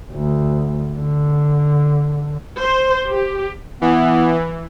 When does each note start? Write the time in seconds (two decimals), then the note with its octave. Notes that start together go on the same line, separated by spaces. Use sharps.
0.12 D2
0.95 D3
2.60 C5
3.11 G4
3.82 E3 B3